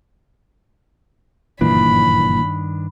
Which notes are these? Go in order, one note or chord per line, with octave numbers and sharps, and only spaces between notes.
F#1 G2 A#2 D#3 E3 D4 B5